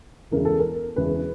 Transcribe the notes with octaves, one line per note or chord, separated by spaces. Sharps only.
E1 E2 C#3 E3 A#4
A4
A#4
E1 E2 C#3 E3 B4